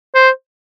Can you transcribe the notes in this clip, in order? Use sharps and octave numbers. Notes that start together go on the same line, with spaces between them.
C5